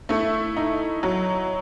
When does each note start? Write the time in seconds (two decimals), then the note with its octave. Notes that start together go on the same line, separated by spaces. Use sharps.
0.09 A3 E4
0.57 D#4
1.03 F#3